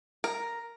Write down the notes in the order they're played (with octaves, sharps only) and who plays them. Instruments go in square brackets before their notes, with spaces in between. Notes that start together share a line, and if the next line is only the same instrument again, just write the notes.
[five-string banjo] A#4